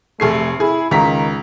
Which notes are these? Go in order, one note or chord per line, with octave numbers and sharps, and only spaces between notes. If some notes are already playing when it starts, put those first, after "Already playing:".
F1 A3 G#4 C7
E4 G#4
C#2 D#3 A#5 B6